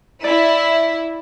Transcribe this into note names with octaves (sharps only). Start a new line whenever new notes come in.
E4 D5